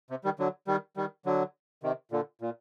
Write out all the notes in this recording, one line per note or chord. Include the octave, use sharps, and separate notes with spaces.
C3
D#3 G3
D3 F#3
D#3 G3
D#3 G3
D3 F#3
C3 D#3
A#2 D3
A#2